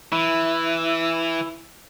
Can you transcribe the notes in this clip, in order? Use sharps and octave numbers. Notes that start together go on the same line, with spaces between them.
E3 E4